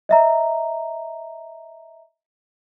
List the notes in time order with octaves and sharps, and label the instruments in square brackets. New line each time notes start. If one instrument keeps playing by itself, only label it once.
[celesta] D#5 E5 A#5